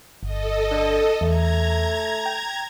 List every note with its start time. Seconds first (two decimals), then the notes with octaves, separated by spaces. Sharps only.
0.23 G1 A4 D#5
0.71 D3
1.21 E2 A3 A#5 G#6
2.26 G5